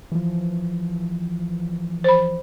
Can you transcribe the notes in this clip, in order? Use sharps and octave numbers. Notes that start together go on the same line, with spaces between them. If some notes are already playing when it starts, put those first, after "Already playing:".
E3 F3
C5 B5